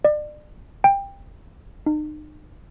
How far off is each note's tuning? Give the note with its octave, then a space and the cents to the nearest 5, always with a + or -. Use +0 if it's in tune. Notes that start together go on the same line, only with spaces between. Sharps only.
D5 +35
G5 +20
D#4 -40